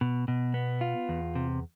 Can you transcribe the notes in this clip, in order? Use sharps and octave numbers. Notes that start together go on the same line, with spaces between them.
B2
B2
B3
F4
E2
C3